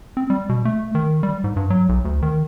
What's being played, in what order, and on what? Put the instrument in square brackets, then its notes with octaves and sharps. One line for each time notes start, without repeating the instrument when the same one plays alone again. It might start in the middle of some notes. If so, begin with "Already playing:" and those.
[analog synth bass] C4
G3
B2
A3
D#3
G3
G#2
G2
F#3
B1
D2
D#3